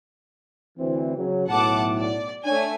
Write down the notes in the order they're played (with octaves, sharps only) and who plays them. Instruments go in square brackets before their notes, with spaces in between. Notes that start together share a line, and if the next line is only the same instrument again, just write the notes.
[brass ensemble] D2 E3 C4
C#3 F#3
[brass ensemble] B1 A2 [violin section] F#5 A5 D6
[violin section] D5
[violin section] A3 G#5 [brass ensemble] D4 C#5